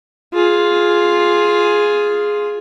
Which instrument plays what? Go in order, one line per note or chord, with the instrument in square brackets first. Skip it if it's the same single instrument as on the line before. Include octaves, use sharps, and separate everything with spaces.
[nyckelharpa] F4 G#4